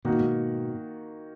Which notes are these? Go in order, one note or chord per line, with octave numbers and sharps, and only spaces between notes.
B2 D#3 A#3 D#4 F#4
A#2
G#2 B2